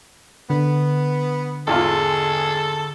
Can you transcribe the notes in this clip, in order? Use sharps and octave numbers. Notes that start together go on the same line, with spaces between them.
D3 B3
G#1 E2 G#3 F4 G#4 A4